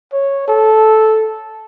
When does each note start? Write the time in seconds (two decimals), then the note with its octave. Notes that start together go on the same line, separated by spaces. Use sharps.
0.13 C#5
0.48 A4